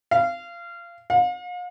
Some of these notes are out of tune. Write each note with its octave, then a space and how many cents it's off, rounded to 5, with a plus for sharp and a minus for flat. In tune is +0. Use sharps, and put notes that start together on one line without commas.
F5 -25
F5 +40